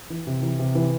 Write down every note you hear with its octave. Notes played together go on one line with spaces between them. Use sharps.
E3
C3
E3
C3
E3